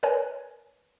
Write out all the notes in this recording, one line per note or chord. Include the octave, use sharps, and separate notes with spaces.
A#4 B4 C#5 G#5